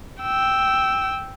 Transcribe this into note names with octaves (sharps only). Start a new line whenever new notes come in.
G5 E6